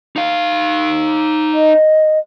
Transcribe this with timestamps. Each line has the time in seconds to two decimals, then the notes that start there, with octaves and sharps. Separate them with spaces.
0.16 D#4 F5
1.54 D#5